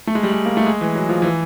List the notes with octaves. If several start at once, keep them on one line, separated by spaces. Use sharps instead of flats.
A3
G#3
G3
G#3
A#3
A3
G#3
E3
F#3
F3
E3